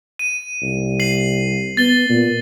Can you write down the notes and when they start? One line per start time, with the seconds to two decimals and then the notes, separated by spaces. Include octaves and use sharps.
0.19 D#7
0.62 C2
1.00 C7 F#7
1.77 B3 A6 G7
2.10 A#2